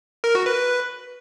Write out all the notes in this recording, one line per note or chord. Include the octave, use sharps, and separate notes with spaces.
A#4
F#4
B4